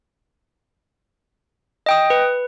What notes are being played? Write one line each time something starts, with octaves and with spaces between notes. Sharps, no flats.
D#5 G5 D#6
B4